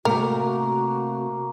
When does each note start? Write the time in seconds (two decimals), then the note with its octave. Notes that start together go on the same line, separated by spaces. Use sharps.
0.05 C3 A3 A#3 F#4 A#4 A#5